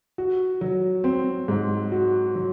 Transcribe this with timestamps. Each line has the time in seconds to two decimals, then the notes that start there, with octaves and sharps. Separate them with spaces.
0.18 F#4
0.61 F#3
1.04 C4
1.48 G#2
1.92 F#4
2.35 F#3